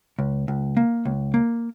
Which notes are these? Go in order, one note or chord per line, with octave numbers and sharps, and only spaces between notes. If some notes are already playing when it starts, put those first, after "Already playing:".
C#2
C#2
A#3
C#2
A#3